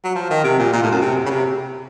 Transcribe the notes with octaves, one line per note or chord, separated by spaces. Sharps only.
F#3
F3
D#3
C3
A#2
A#2
A2
F#2
C3
C#3
C3